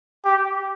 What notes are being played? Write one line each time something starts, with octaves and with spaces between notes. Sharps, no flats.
G4